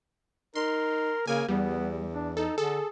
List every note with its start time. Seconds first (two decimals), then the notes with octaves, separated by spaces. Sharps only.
0.55 D#4 A#4 C6
1.27 C#3 A#3 G#5
1.49 E2 G3 B3
2.13 D4
2.37 D#4 A4
2.58 D3 G#4 A4